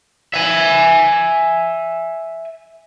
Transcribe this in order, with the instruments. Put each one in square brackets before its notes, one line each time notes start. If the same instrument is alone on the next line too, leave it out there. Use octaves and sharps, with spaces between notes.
[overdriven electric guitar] E5 G#5